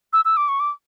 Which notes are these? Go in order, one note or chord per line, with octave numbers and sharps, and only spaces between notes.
E6
E6
D6
C#6
D6